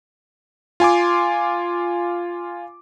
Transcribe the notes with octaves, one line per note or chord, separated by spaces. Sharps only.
F4 G#5 C6 D6